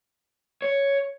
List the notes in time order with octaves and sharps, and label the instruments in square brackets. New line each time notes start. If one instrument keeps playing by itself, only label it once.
[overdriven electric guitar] C#5